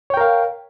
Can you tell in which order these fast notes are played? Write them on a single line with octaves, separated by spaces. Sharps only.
C#5 G5 A#4 F5